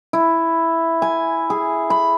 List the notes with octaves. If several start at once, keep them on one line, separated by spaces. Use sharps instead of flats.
E4
G#5
G#4
B5